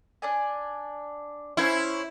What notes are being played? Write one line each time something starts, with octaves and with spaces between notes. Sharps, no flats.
D4 D5 G#5
C#4 E4 C5 C#5